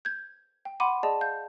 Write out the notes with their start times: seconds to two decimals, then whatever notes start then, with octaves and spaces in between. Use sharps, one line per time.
0.05 G6 G#6
0.65 G5
0.80 F#5 B5 C6 D6 D#7
1.03 G#4 D5 D#5 A5
1.21 F5 G6